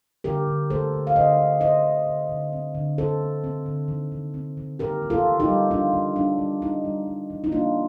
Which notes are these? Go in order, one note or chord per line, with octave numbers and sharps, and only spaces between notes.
D3 G4 A#4
D3
A3 A4 C5
D3
F5
D3 C5 D#5
D3
C4 C5 D#5
D3
D3
D3
C4
D3
C4 A4 C5
C4
C4
D3
D#3
D#3
C4
D#3
D#3 G4 A#4
D#3
F4 A4
D#3
D#4 G4
G3
D#3 D4 F4
D#3
G3 D4
G3
D#3 D#4
G3
G3
D#3
D#4
A#3 D4 F4